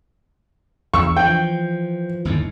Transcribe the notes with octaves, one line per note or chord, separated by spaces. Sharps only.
E2 C#6 E6
E3 F3 G5
G1 D#2 A2